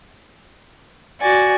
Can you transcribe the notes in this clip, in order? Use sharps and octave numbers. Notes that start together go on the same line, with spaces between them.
F#4 D5 G#5